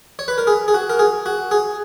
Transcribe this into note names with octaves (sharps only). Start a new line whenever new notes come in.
C#5
B4
A#4
G#4
G#4
F#4
A#4
G#4
F#4
G#4